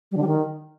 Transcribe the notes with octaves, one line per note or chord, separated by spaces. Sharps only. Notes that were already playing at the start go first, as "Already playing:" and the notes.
G3
D3
G3
D#3